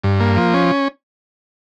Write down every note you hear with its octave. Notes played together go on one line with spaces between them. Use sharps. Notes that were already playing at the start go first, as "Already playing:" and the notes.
G2
A#3
F3
C#4